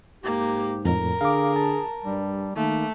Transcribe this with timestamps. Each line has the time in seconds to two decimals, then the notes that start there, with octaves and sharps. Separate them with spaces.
0.24 G#2 A#3 G4
0.85 F2 A2 A#4
1.21 D3 G#4 F5 D6
1.56 A5
2.05 G2 G3
2.56 D#3 A3 A#3